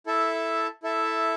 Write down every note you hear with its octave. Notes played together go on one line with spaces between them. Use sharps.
E4 A4 E5 A5
E4 A4 E5 A5